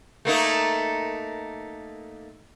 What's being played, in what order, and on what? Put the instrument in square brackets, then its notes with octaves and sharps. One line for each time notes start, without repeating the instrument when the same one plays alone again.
[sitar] A3 A#3 D#4